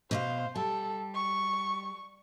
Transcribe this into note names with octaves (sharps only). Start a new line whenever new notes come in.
B2 C5 C#5 F5
G3 A4
C#6